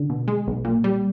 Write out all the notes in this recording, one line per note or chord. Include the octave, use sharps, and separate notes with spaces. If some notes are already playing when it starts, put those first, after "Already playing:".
Already playing: D3
B2
G#3
B1
A#2
G3